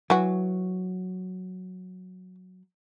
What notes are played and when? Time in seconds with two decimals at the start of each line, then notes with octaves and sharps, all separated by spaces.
0.10 E3 F#3 F#4